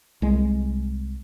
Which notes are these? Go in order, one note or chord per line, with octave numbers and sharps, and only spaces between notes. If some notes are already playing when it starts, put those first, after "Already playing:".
C2 G#3